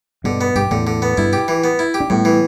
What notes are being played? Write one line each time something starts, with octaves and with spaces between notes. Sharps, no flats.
G2 B2 D3
B3
G2 G4
E2 A2 D3
D3
B3
G2 B2 E4
G4
E3
B3
E4
G4
D4
A2 G3 B3
E3